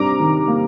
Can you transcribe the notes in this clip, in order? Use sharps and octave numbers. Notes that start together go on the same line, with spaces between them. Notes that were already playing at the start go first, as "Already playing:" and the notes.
Already playing: C3 G3 D4 A#5 D6
D#3
A#3